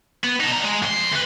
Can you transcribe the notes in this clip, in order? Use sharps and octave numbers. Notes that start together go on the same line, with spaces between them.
B3
D#4 A4
G3 A#5
G#3
F2 C6
D2 B4